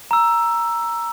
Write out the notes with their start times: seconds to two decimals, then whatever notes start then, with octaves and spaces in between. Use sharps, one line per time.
0.11 A#5 E6